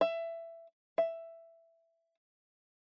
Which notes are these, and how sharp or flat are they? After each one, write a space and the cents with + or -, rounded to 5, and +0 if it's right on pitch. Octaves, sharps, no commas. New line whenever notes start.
E5 +15
E5 +10